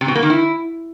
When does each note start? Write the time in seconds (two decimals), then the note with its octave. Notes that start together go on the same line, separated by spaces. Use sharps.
0.01 C3
0.08 B2
0.15 A#3
0.23 D#3
0.30 E4